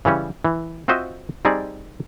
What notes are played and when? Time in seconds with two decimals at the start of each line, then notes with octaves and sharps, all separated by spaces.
0.05 C#3 E3 G3 C#4
0.45 E3
0.88 C4 F4 F#4 C5 D#5 E5
1.45 G3 C4 D#4 G#4 D5